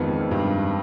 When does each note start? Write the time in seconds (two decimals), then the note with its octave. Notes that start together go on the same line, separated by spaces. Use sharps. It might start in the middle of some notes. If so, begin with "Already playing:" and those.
Already playing: F2 G#2 D#3 B3
0.21 F2
0.31 G2